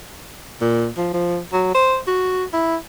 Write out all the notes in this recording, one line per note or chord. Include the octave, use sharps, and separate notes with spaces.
A#2
F3
F3
F#3
C5
F#4
E4